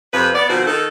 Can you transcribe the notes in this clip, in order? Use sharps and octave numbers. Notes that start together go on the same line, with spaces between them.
F2 C3 F3 B4
B3 D5
B2 D#3 F3 C4 F4 F#4
D#3 A4